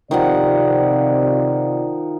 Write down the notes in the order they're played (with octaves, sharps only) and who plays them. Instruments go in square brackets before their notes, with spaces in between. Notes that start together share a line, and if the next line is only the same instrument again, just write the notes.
[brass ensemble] C3 F4 D5 [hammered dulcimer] D#3 F3 F#5